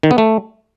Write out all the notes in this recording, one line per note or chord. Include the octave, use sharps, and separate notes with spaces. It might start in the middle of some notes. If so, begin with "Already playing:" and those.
D#3
B3
A3